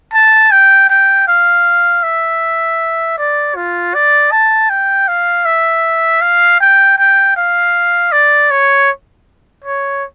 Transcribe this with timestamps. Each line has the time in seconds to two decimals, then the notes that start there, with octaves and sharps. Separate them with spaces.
0.14 A5
0.51 G5
0.89 G5
1.28 F5
2.03 E5
3.18 D5
3.56 F4
3.94 D5
4.31 A5
4.70 G5
5.08 F5
5.45 E5
6.21 F5
6.60 G5
6.98 G5
7.36 F5
8.12 D5
8.51 C#5
9.64 C#5